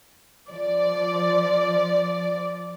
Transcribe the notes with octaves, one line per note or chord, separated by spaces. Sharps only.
F3 D5